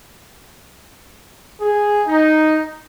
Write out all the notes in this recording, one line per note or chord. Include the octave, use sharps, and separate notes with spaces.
G#4
D#4